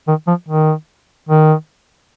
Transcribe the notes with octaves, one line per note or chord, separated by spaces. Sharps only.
D#3
F3
D#3
D#3